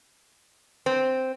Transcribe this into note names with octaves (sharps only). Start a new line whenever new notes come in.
C4